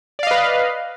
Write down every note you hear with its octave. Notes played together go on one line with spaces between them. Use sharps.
B4 D5 D#5 F5